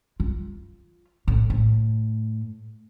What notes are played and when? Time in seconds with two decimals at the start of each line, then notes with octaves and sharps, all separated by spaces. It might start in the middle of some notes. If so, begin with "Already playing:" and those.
0.20 F4
1.28 A2
1.50 A2